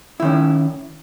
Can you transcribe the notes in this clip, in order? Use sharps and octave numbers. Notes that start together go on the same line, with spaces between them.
D#3 C#4 E4